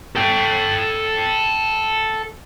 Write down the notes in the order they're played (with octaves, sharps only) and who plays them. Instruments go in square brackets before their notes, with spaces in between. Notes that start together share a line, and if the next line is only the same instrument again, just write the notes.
[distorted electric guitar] A4 G5